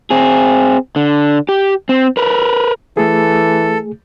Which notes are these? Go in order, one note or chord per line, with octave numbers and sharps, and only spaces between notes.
C4 G#4
D3
G4
C4
A#4 B4
E3 A3 G#4 A4